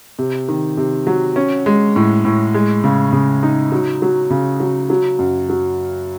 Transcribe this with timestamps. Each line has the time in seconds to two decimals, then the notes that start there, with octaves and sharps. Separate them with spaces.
0.19 C3
0.48 D#3
0.77 C3
1.07 F#3
1.36 C#4
1.66 G#3
1.96 A2
2.25 A2
2.54 G#3
2.84 C#3
3.13 C#3
3.43 D#4
3.72 F#3
4.02 F#3
4.30 C#3
4.60 F#3
4.90 F#3
5.19 F#2
5.49 F#3